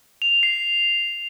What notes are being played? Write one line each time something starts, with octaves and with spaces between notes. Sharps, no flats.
F7
C7